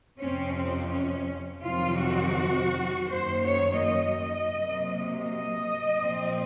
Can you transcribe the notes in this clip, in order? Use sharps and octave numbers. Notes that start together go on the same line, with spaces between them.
F2 C3 F3 C4 C#4
C4
C#4
F2 C3 D#3 F#3 C4 F4
F#4
F#2 D#3 A#3 C5
C#5
D#5
C3 F#3 A#3
D#5
A#2 F3 C4